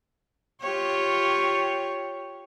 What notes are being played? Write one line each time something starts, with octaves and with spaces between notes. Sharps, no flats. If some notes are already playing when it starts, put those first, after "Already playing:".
F4 G4 C#5